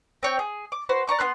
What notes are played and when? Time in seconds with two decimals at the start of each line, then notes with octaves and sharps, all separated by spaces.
0.23 C4 C#5 G5
0.39 G#4
0.72 D6
0.89 F#4 B4 C5
1.07 D5 A#5 C#6 D6
1.19 B3 C#4 C6 F#6